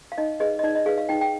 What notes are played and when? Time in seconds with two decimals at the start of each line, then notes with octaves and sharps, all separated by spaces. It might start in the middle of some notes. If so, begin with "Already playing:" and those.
0.12 F5
0.18 D#4 D#5
0.40 G#4 B4 D#5
0.59 D#5
0.63 D#4 D5
0.75 D#5
0.86 G#4 B4 F5
0.98 F5
1.09 D#4 G5
1.21 G5